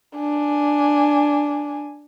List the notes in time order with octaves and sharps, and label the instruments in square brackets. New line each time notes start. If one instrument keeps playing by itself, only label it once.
[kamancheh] D4 G#5